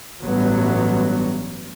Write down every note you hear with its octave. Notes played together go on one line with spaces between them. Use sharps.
A1 G2 F#3 B3